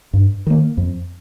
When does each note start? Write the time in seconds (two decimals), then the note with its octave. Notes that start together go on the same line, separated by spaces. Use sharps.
0.13 G2
0.47 D#3 A#3
0.77 F2